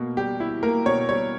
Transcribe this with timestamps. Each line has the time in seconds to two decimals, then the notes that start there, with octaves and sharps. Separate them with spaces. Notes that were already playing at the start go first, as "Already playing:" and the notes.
Already playing: B2 A#3
0.17 G3 G4
0.40 E4
0.63 A#3 A#4
0.86 B2 C#5
1.09 G3 C#5